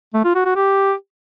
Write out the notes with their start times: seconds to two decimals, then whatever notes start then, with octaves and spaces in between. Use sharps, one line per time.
0.14 A3
0.25 F4
0.35 F#4
0.45 F#4
0.56 G4